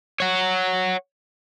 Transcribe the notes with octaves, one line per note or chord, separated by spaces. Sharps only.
C#5 F#5